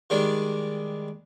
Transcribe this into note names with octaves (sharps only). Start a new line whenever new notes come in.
D#3 G3 G#3 D4